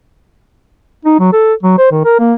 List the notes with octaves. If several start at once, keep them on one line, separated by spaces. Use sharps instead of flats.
D#4
F#3
A4
F#3
C5
D#3
A#4
A#3